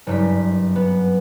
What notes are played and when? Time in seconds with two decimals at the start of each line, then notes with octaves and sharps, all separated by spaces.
0.07 F#1 G2 B6
0.76 B3